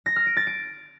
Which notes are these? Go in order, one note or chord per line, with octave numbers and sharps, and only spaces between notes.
A#6
F6
D7
A6
D7